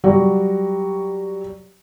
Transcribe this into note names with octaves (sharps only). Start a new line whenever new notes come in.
F#3 G3 F#4